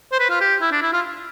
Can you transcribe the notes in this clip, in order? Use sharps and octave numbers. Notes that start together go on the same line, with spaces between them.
C5
B4
F4
G4
E4
D4
E4
F4